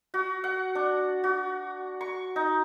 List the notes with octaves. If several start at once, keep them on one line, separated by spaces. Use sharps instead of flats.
F#4
F#5
D4
F#4
C#6
D#4